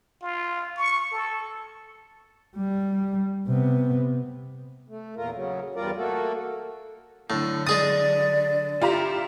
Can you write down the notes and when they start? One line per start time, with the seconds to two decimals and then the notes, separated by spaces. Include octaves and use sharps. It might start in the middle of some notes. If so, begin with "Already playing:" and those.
0.22 F4
0.76 C#6
1.12 A4
2.56 G3
3.47 C3 B3
4.88 A3
5.16 E2 A#2 F4 A#4
5.34 C#3 F#3
5.75 E2 G2 G3 F4 A#4 D5
5.96 A3 A#3 F#4 A4
7.30 A2 D3 F#3
7.67 G#3 G#4 D5 D#6 A6
8.82 E4 F4 G4 E5 A#5